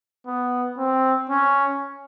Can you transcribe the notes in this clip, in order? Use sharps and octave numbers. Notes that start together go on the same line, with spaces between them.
B3
C4
C#4